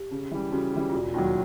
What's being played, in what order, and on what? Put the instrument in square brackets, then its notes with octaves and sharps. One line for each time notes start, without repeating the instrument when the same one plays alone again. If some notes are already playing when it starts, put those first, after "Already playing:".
Already playing: [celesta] G4
[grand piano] C#3
E3 G3
[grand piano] C#3 [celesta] F#4
[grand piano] E3 G3
[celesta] F4
[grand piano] E1 [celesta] F#4
[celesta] F4
[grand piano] D#2 D#3 F#3 [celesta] F4
[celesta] F#4